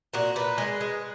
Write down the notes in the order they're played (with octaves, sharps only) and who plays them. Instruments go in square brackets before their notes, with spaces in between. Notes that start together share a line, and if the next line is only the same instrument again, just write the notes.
[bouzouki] A#2 F#4
A#2 B4
G#3
G#3